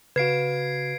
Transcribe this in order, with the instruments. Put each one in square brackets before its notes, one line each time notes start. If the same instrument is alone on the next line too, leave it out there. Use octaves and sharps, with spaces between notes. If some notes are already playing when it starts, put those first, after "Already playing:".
[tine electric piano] C#3 F#4 [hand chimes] B4 F5 [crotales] G#6 C7 D7